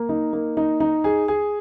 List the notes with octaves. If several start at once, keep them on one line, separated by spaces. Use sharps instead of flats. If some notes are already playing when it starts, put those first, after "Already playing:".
Already playing: A#3
D#4
A#3
D#4
D#4
G#4
G#4